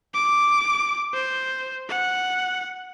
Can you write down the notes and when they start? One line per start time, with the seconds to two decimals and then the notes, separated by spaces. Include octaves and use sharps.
0.14 D6
1.13 C5
1.88 F#5